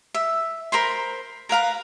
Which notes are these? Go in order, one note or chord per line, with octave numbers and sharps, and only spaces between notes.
E5
A#4 C5 B5 C6
A#4 B4 F5 A#5